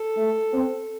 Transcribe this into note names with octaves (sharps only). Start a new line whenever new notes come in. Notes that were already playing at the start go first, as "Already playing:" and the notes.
Already playing: A4
A3
C4